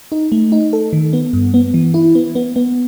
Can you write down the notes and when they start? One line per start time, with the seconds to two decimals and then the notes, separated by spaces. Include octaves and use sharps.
0.12 D#4
0.32 A3
0.52 D#4
0.73 A4
0.93 D#3
1.13 B3
1.33 G2
1.54 B3
1.74 E3
1.94 E4
2.15 B3
2.35 B3
2.56 B3